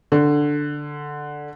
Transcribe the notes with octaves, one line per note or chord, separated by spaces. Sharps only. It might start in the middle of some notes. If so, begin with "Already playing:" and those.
D3